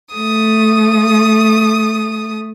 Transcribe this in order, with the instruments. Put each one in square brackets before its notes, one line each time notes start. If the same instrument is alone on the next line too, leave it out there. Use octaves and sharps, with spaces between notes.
[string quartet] A3 D#6